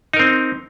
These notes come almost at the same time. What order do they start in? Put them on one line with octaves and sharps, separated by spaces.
D#4 A#4 C4